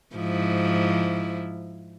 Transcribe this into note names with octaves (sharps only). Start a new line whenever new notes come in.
G#2 F3 E4